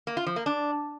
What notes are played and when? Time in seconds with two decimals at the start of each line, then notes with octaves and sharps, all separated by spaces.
0.07 A#3
0.17 F4
0.27 F3
0.36 A#3
0.46 D4